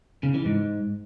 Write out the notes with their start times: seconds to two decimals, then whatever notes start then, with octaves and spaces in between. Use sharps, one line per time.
0.23 C#3
0.34 E3
0.45 G#2